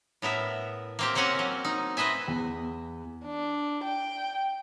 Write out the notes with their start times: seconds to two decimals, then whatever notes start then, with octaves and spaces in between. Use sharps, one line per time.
0.22 A2 B3 A#4 E5
0.99 A#3 C4 G4
1.15 A#3 C4 C#4 F#5 G#5 A#5
1.39 F#3
1.65 D#4
1.97 C4 B4 D#5 E5 G#5
2.28 E2
3.25 D4
3.84 G5